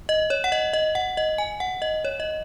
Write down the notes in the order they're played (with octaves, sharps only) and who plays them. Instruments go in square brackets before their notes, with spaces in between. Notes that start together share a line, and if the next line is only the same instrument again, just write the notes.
[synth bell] D#5
C#5
F#5
D#5
D#5
F#5
D#5
G#5
F#5
D#5
C#5
D#5